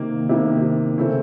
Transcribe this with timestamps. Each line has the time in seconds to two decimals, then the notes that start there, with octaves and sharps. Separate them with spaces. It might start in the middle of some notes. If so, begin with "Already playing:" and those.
Already playing: C3 D#3 A#3
0.29 C3 D#3 A#3
0.97 C#3 A3 C4